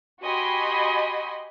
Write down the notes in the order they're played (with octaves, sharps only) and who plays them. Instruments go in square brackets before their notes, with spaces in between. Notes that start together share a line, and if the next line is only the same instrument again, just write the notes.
[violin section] F#4 G4 D#5 G#5 B5 C6